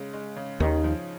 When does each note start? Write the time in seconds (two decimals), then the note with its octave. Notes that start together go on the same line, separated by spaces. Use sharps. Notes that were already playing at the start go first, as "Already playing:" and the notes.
Already playing: C#3 G#3
0.13 G#3
0.36 C#3
0.60 D#2 D#3 D#4
0.84 F3